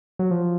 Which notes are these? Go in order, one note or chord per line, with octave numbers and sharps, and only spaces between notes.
F#3
F3